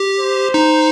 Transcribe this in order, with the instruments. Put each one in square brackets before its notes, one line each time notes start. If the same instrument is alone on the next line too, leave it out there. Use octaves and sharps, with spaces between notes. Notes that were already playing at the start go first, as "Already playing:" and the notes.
Already playing: [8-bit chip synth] G4
[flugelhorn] C5
[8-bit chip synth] D#4